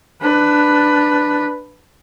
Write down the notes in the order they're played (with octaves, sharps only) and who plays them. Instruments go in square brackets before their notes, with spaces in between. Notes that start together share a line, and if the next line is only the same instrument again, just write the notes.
[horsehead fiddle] D4 B4